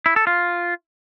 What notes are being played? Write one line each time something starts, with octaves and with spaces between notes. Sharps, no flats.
E4
A4
F4